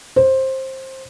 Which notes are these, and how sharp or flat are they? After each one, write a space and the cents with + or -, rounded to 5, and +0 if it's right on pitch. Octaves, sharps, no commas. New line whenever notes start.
C5 +15